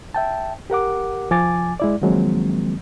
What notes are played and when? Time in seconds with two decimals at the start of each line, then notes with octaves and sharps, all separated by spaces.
0.14 E5 G5 A5
0.70 G4 A#4 F#5 D6
1.31 C2 F3 G#5 D6 A6
1.80 G#3 E4 D5
2.02 D#3 F3 F#3 G#3 A#3 C4